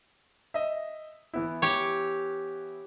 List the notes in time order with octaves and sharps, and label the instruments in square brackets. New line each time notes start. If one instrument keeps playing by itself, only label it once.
[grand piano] D#5 E5
E3 B3 E4
[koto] G4 C#5